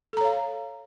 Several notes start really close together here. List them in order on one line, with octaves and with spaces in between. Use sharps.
A4 A#5 C#5 F5